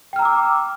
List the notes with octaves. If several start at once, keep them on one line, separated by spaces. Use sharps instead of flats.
G5 A#5 D6 E6 F6